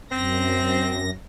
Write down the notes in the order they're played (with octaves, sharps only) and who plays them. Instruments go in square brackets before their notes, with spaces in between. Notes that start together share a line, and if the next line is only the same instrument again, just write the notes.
[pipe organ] F#2 A#6 [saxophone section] C4